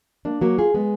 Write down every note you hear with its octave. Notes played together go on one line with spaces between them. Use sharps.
A#3 D4
F#3 A#3
F4 G#4
G#3 B3